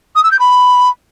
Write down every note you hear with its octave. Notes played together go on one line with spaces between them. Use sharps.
D#6
E6
G6
B5